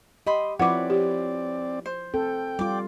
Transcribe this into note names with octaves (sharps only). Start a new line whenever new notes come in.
G4 D#5 B5 C6
F3 C4 E4 B4 C#5 D5 F#5 D6
G4
C5
C4 A4 G5
G3 F4 D5 D6